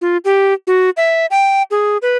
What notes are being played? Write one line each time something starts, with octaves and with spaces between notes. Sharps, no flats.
F4
G4
F#4
E5
G5
G#4
B4